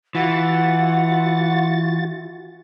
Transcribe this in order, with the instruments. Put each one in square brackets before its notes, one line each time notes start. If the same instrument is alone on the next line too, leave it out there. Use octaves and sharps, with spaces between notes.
[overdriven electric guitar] E3 [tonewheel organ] F4 F#4 A6 [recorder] F#5